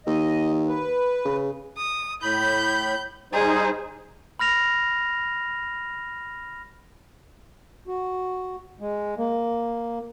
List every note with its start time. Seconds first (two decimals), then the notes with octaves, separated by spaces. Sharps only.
0.07 D#2 D#5
0.67 B4
1.25 C#3
1.78 D#6
2.22 A2 B5 G6
3.33 G3 D#4 G#4 C5
4.39 B5 F6 A#6 F7
7.87 F#4
8.80 G#3
9.18 A#3